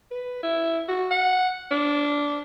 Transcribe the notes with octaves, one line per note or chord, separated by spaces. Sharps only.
B4
E4
F#4
F#5
D4